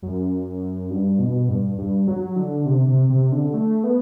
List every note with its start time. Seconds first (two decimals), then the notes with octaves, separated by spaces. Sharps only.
0.02 F#2
0.90 G2
1.19 B2
1.49 G2
1.78 G2
2.08 F#3
2.36 D3
2.66 C3
2.88 C3
3.09 C3
3.32 D3
3.54 A3
3.84 B3